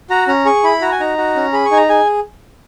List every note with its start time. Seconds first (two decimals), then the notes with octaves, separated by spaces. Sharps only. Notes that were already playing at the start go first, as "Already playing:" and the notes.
0.10 F#4 A#5
0.28 C#4 A#5
0.45 G#4 C#6
0.63 E4 B5
0.81 F#4 A#5
0.92 G#5
1.00 D#4 A#5
1.18 F#4
1.35 C#4
1.53 G#4 B5
1.66 C#6
1.71 D#4 G#5
1.77 A#5
1.89 G#4 G#5